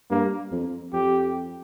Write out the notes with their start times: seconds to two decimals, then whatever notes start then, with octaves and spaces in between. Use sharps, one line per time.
0.10 G2 A#3
0.51 F2
0.93 F2 G4